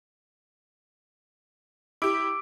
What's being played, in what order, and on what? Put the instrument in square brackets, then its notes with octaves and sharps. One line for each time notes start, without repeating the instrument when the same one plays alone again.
[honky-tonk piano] E4 G4 [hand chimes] D6 E6 D7